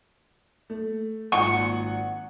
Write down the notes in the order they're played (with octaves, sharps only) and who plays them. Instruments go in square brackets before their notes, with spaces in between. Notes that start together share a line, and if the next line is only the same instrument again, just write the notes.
[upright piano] A3
[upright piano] G#1 A#2 F#5 [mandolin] C#6